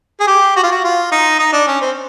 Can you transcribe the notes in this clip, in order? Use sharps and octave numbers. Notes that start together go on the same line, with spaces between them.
G#4
G4
F#4
F4
F#4
F4
D#4
D#4
D4
C#4
C4